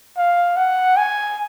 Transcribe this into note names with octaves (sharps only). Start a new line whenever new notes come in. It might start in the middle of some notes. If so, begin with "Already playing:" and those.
F5
F#5
G#5